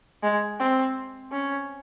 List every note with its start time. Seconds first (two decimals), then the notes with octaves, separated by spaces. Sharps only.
0.23 G#3
0.59 C4
1.31 C#4